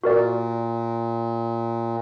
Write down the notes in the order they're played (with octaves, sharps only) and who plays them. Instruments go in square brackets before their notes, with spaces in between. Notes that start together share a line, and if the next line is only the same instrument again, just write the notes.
[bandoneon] A#2 [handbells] F#4 A#4 D5